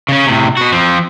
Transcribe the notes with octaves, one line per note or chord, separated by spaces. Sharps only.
C#3 C#4
A2 C3
B2 F#4
F3 C4